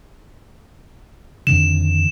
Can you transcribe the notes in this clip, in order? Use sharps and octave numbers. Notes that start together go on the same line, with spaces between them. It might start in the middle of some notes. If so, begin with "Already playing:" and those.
F2 D3 D#3 E7